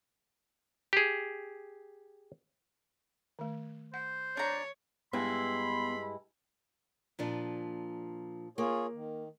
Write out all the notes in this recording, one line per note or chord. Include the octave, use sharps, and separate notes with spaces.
G4 G#4
D#3 A3
C5 F#5
D4 C#5 A#5
G2 G#3 B3 E4 B5 C6
A#2 F3 D4
A#3 F4 G#4 C#5
D#3